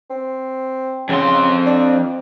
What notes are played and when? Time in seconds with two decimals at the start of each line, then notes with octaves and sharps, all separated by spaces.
0.10 C4
1.09 F2 C#3 C6
1.66 D4